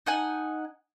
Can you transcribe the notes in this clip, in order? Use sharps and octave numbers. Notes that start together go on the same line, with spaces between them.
D#4 F#5 G#5